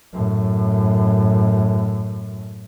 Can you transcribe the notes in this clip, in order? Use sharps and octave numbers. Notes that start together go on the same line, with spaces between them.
F#2 A2